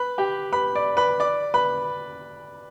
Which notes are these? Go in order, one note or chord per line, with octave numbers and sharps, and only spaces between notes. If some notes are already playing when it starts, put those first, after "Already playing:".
Already playing: B4 B5
G4 G5
B4 B5
D5 D6
B4 B5
D5 D6
B4 B5